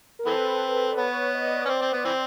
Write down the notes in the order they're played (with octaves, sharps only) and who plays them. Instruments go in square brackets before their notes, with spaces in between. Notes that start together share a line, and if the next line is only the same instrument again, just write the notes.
[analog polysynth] A#4
[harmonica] E3 C4 [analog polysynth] A4 B4
[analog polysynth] D5
[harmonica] B3 [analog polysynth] B4 C#5
[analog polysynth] D#5
D5
C#5
[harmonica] C4 C#4 [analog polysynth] C5 D5
[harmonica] C4
B3
E3 C4